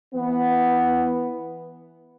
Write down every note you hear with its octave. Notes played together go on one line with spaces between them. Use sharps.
E3 B3